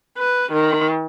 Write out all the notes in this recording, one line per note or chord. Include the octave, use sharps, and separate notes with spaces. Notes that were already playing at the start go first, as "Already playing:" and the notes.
B4
D#3